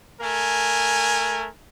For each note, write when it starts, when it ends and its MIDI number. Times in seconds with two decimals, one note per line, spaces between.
0.21 1.48 57
0.21 1.48 70
0.21 1.48 80